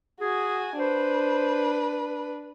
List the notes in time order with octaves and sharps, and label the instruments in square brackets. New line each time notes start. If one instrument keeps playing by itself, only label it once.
[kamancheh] F#4 G#5 [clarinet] G#4
[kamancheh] D4 B4 [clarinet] C5